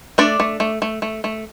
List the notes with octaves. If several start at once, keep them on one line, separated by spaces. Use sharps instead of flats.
A3 D4 D5
A3
A3
A3
A3
A3